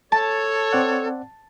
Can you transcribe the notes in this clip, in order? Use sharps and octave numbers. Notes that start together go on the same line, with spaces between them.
A4 C#5 A5
C4 D5 F#5